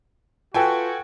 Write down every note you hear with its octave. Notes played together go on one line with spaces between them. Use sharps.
F4 F#4 A4 B4 G5 G#5